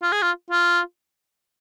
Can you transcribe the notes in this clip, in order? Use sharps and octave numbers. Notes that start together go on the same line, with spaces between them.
F4
G#4
F4
F4